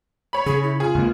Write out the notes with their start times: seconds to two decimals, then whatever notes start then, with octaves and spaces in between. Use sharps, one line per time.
0.33 C#5 B5
0.46 C#3 G#4
0.63 E4
0.80 F4 G#4
0.95 C#2 A#3